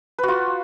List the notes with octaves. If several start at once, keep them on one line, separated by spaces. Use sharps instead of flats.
F4 F#4 B4